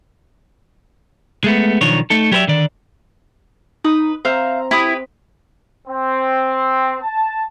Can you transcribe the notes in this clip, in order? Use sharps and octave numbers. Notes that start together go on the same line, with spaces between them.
G#3 A3 B3
B1 D#3 F3 D4 C#5
A3 D#4 A4
F#3 G4 A#4 B4 D5 E5
D3 D#3 D5
D#4 B4 D#6
C4 C5 E5 F5 A#5
E4 G4 B4 D#6
C4
A5